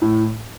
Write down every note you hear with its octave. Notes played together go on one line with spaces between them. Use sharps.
A2